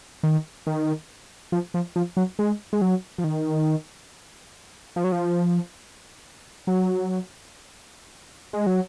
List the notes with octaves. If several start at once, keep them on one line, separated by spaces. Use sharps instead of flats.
D#3
D#3
F3
F3
F3
F#3
G#3
G#3
F#3
F3
D#3
F3
F#3
F3
F#3
G#3
F#3